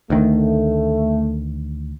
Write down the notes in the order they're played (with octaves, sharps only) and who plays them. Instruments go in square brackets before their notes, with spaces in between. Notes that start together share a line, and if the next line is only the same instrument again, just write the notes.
[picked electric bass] D2 D#3 [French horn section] A3